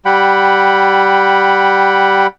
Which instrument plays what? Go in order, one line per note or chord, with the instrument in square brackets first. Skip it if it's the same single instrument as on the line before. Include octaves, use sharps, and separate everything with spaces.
[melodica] G3 F#5 G5 B5